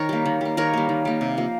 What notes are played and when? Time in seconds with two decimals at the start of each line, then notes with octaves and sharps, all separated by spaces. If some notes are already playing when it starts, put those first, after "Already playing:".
Already playing: D#3 A#4 C#5
0.09 G3 A#3
0.26 D#3
0.41 G3 A#3
0.57 D#3 A#4 C#5
0.73 G3 A#3
0.89 D#3
1.05 G3 A#3
1.21 C3
1.37 F3 A#3